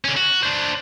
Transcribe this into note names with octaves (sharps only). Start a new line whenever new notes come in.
D3 C#4
F#4
D4 C5